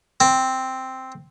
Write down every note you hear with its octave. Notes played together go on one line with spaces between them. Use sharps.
C4